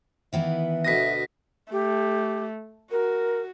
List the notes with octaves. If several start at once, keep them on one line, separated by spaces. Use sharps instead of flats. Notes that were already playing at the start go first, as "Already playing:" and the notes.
D#3 E3 B3 E5
D2 B2 D#6 A#6 B6
A3 G4
F#4 A#4